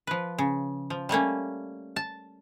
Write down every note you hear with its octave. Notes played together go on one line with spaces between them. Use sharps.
F3 B4
C#3
F3
G3 A3 A#3 C#4
A5